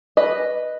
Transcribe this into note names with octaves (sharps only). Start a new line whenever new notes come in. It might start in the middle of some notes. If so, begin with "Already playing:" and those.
B4 D#5